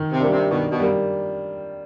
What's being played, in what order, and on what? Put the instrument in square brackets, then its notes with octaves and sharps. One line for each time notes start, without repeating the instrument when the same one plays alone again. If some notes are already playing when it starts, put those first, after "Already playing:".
Already playing: [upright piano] D#3
[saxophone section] C3
[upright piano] G3 A#3 D4
[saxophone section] C3
[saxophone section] B2 [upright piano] D#3
[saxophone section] B2
[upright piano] G3 A#3